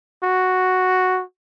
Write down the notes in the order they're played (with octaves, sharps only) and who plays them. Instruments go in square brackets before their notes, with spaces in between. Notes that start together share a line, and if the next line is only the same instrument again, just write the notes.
[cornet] F#4